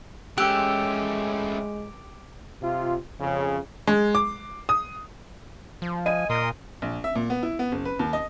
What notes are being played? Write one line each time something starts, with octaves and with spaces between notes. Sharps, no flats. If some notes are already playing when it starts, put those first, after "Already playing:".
G#3 A3 C#4 G4 G5 E6 F#6
C3 F4
F2 C#3
G#3
D6
D#6
F3
D#5 G#5 D#7
A#2 A#4 C6 D#6
A#1
E5
A#2
B3
E4
B3
F#1
B4
D#2
D#5